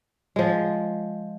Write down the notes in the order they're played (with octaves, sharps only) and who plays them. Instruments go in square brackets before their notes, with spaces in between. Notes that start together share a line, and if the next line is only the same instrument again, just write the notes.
[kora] F3 G#3